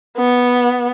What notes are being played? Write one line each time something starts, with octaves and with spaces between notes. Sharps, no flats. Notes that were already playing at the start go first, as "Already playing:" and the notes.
B3